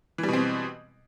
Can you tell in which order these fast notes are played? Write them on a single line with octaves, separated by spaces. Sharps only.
E3 G3 B2 C4